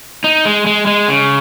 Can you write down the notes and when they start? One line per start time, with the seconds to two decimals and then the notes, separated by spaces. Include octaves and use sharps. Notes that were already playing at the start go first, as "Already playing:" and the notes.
0.24 D#4
0.45 G#3
0.67 G#3
0.87 G#3
1.08 C#3